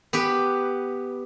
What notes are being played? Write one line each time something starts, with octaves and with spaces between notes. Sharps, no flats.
B3 G4 B4